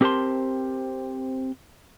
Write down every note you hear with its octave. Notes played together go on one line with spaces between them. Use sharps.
C4 G4 A#4 C5 A5 C6